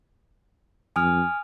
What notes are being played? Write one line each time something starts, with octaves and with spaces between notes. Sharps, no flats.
F2 G#5 D#6 F6